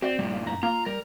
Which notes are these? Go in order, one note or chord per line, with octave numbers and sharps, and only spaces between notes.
C4 F#4 D5
G2 A#2 G3
F#2 A#5
A#3 F4 A#5
G3 A#4